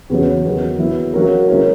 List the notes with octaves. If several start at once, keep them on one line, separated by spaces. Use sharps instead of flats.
E2 C#3 F#3 C#4
E2 D#3 F#3
F#3 B3 E4
F#3 A#3 C#4 F#4 A#4
C#3 G#3 C#4 E4 A#4